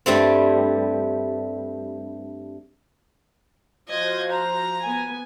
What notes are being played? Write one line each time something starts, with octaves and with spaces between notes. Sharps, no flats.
G2 G3 A3 C4
F3 F#4 C5 D#5 G#6
A#5
B3 G#5